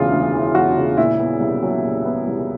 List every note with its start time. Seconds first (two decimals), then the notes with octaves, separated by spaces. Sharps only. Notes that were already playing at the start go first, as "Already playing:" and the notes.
Already playing: E1 D2 C#3 E3 F4
0.11 D2
0.33 E3
0.55 E1 F#4
0.77 C#3
0.97 A#2 E4
1.19 B3
1.40 C2
1.63 F#3
1.83 A#2
2.05 B3
2.27 C2